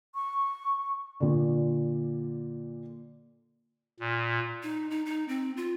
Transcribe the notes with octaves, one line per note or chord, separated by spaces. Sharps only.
C#6
A#2 D3
A#2
D#4
D#4
D#4
C4
F4